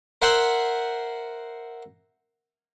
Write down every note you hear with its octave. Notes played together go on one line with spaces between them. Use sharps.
A#4 C5 E5 F#5 G#5 C6